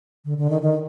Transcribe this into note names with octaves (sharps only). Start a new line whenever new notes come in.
D3
D3
D#3
D#3